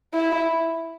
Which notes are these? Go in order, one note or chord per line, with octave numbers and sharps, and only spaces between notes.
E4